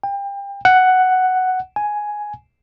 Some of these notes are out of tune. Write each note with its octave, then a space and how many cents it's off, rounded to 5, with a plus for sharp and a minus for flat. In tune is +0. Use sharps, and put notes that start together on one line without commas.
G5 +30
F#5 +5
G#5 +5